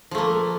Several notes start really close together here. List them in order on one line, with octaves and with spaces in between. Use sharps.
F3 A3 A#3